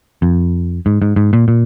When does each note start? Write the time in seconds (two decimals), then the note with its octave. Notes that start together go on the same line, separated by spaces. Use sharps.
0.22 F2
0.86 G#2
1.02 G#2
1.16 G#2
1.33 A#2
1.48 A#2